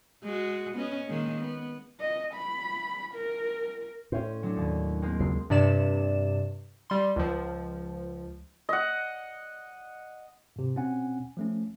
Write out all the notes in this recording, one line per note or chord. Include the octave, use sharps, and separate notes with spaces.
G#3 F#4
B3 C#4 D#5
D#3 G#3 A#3
B3
D#5
B5
A#4
A2 C#4 C5
F#3 C#4 D4
D#2
G#3 A#3 C4
C#2 C7
G2 C3 D5 E7
G3 C6
C#2 F3
D#5 F#5
G#2 C3
B2 C4 C#4 F#5 G#5
F3 A3 C#4